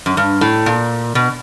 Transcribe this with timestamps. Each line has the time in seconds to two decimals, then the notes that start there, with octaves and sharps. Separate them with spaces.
0.06 F#2
0.17 G2
0.41 A2
0.66 A#2
1.15 B2